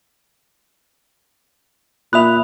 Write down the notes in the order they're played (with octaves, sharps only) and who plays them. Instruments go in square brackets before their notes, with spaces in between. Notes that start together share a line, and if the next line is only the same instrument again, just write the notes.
[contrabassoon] A#2 [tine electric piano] E5 F#6 [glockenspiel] B5 D#6 F7